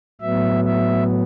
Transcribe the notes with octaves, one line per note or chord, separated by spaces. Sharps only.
A2 F#3 B3 E5
E5